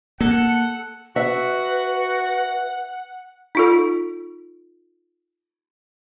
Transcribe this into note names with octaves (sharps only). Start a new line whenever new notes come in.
A#3 A4 F#5
F#4 B4 E5 F#5
D#4 F4 A4